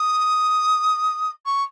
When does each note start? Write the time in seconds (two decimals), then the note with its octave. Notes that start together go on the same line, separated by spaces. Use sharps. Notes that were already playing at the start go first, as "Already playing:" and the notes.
Already playing: D#6
1.46 C#6